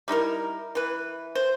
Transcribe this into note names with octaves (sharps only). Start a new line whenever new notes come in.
G3 D#4 E4 A#4
E3 B4
C5